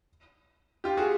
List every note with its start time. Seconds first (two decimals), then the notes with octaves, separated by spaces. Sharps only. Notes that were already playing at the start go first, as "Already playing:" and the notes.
0.84 F4 G4
0.97 F#4 G#4